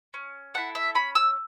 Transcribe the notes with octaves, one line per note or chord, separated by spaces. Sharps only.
C#4
E4 A4 F#5
E5
C#4 B5
E6